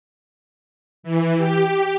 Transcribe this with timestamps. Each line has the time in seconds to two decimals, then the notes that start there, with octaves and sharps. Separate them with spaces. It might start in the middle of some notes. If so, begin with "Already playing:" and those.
1.03 E3
1.38 G4